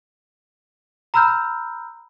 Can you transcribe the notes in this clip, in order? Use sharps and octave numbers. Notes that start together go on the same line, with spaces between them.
A#5 B5 E6 F6 G6